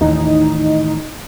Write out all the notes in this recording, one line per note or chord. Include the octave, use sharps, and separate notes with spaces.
D#2 A2 D#3 E3 D#4